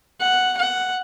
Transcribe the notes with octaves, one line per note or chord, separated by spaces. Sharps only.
F#5
F#5